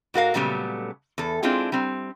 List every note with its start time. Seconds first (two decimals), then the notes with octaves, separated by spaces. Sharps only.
0.14 G#2 F#4 A#4 F5
0.34 A#2 C#3 F#3 G3 A3 B3
1.18 E2 A4
1.43 G#3 C4 D4 E4 F4 G#4
1.72 G3 C4